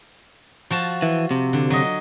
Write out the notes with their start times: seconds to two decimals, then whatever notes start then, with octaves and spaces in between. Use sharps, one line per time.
0.71 F3 F#4 A5
1.02 E3
1.31 C3
1.53 D3
1.70 F#3 D#5